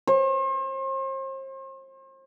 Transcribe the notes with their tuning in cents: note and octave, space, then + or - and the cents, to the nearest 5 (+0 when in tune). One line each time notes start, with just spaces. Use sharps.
C5 +40